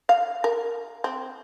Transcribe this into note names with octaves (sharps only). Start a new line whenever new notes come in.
F5
A#4
C4